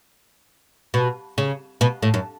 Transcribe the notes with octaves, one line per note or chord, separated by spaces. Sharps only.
B2
C#3
B2
A2
F#2